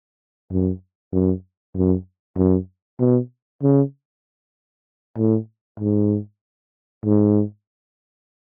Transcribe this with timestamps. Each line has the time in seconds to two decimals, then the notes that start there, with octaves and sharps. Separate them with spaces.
0.52 F#2
1.13 F#2
1.76 F#2
2.37 F#2
3.00 B2
3.63 C#3
5.18 A2
5.80 G#2
7.05 G#2